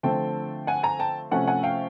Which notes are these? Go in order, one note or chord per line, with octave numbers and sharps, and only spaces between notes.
D3 F3 A3 C4 G5 A5
F#5 G#5
G#5 A#5
G5 A5
C3 F3 A3 C#4 F#5 G#5
F#5 G#5
F5 G5